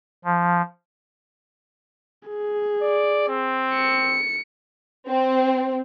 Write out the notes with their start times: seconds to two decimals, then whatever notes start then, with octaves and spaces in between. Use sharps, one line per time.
0.25 F3
2.29 G#4
2.82 D5
3.28 C4
3.75 C#7
5.08 C4